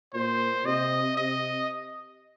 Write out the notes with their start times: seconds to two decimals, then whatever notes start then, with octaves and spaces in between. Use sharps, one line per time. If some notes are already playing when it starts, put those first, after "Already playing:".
0.14 A#2 C5
0.65 C3 D#5
1.17 C3 D#5